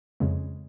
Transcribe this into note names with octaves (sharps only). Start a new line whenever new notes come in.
F2 C#3 G#3